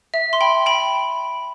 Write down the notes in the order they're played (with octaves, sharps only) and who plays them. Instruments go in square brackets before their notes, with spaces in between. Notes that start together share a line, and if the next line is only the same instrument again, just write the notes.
[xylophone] E5
C6
G5 B5
G5 B5